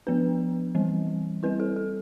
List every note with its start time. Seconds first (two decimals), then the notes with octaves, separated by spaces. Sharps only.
0.07 F3 B3 D4 B4
0.75 E3 G3 C4
1.43 G3 C4 E4 B4
1.60 A4
1.76 A4